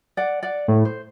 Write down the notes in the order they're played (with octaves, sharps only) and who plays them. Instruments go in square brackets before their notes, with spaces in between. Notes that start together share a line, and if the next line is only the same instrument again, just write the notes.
[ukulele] D5 F#5
D5 F#5
[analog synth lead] A2
[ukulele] C5